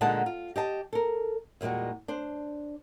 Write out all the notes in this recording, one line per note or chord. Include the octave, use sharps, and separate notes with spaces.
A#2 D3 G#3 D#4 F#5 A5
F4
G4 D#5 A5
A4 A#4
E2 A#2 G3 G#3 F#4
D4 C5